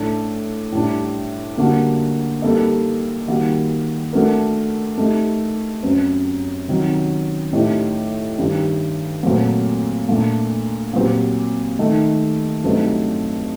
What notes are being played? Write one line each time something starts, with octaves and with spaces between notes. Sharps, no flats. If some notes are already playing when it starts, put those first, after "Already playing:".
Already playing: A2 A3 D4 A4
A2 G3 D4
D3 G3 A#3 D4 F#4
G3 A#3 D#4 A4 D#5
D#3 G3 A#3 F#4
A3 D4 F#4 A#4
A3 D#4 G4
F#2 F#3 C4
C3 D#3 F#3
A2 A3 D#4 G4
G2 D#3 G3
A#2 F#3 A3 C4
A#2 A3 D4
A#2 F#3 C4 G4
D#3 A3 D#4
G2 F#3 A3 C4 D#4